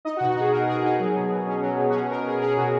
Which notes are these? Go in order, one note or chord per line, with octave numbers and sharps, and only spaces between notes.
D#4 D#5
F#4
B2
F#4
D#4 G#4
D#4 A#4
B2 G#4
D#4 G#4
F#3
B2
B2
C#4
F#3
B2
F#4
C#4 G#4
B2 A#4
B2 G#4
C#4 G#4
B2 F#4